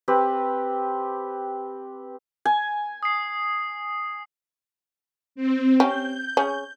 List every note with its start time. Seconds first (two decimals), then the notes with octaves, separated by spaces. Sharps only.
0.08 C4 G4 B4
2.45 G#5
3.03 D#6 C7
5.35 C4
5.80 C#4 G4 G6
6.37 C#4 G#4